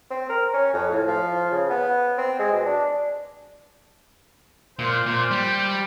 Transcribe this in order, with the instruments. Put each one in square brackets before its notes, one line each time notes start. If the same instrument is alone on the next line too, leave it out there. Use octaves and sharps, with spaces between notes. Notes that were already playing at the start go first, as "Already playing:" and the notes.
[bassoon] C4
A#4
C#4
F2
A2
F3
C#3
B3
C4
G#3
B2
D4
[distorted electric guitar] A#2 [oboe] C5
[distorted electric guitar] A#2
G3